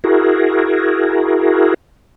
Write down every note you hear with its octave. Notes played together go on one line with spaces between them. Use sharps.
E4 F#4 G#4 A#4